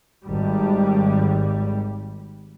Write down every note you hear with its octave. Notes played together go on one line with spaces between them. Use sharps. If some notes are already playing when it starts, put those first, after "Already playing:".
G#1 G3